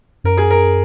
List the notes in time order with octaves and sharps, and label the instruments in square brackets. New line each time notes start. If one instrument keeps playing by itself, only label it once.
[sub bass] F#2 [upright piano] A#4
[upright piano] G#4
A#4